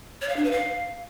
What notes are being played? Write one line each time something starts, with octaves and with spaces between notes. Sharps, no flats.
C#5
F5
D4
B4
F5